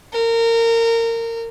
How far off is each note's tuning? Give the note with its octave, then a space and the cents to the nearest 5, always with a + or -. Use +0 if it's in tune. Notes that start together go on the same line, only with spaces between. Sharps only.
A#4 -25